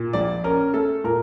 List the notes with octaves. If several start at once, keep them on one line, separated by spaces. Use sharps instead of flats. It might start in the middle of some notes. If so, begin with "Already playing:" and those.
Already playing: A#2
A#1 D5
C#4 A#4
A3 A4
A#2 A#4